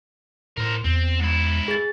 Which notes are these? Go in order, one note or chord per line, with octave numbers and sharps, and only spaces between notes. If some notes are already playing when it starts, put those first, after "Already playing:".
A2 A#4 C5
E2 C4
G#2 E4
G#4 A6